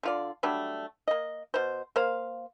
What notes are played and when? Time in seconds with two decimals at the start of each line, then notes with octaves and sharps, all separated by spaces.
0.03 D3 F4 D5
0.43 F#3 G3 A3 D4
1.08 A#3 D#5
1.54 B2 C5
1.96 A#3 C5 F5